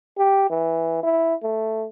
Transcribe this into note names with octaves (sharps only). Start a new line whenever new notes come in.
G4
E3
E4
A3